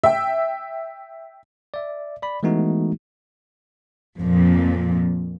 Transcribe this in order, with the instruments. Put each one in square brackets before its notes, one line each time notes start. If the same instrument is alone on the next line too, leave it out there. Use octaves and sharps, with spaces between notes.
[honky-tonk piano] E5 G5
[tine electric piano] D5 E5
D5 B5
E3 G#3 A3 B3 D#4 F#4
[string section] F2 A#2